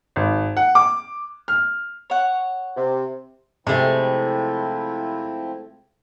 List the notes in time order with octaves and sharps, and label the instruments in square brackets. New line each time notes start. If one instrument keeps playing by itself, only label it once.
[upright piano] G#1
F#5
D6
F6
[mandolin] C#5 F#5
[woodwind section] C3
[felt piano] C3 [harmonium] F3 C4 E4 [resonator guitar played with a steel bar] G#3 A3